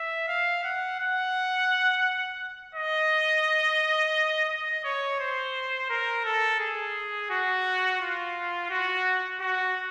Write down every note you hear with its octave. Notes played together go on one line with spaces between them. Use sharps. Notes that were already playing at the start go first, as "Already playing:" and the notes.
Already playing: E5
F5
F#5
F#5
D#5
D#5
C#5
C5
A#4
A4
G#4
F#4
F4
F#4
F#4